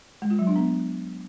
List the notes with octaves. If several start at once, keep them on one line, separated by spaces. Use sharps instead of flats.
G#3
F4
F#3
D4
B3